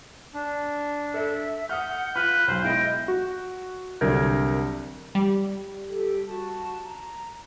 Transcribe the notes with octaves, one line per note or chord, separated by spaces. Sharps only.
D4
A4 E5
F#5 D#6 F6 G6
F4 B4 F6
B1 F#3 C5 F5
G#3 B3 E4 D#5 G5
F#4
C2 D3 F#3 A#4 G6 G#6
G3
G4 A4
F#4 A5
A#5